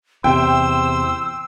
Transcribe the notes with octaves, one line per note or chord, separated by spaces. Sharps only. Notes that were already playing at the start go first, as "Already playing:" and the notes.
E2 C3 C5 G5 E6